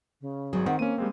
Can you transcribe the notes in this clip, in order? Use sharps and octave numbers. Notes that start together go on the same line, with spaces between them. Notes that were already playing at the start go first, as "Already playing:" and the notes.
C#3
G#1 F#3 G#4
D#3 C4 F#5
A#3 C#4 D#7
G3 G#3 C4